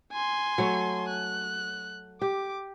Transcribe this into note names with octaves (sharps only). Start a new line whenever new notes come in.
G#5 C6
F#3 A3 C#5
F#6
G4 D6